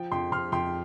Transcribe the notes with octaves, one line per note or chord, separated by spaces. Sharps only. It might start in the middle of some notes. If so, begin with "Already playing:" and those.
Already playing: F3 G5
F2 G5 C6
F2 C6 F6
F2 G5 C6